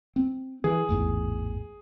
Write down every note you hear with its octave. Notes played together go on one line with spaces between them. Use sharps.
C4
E3 G#4
A1 E2 G#2